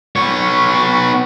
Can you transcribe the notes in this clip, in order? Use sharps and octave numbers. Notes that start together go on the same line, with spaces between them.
B3 C#5